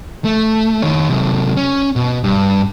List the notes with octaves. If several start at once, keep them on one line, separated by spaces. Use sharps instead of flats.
A3
D#3 C#5
C3 F#3
C#4
B2
G2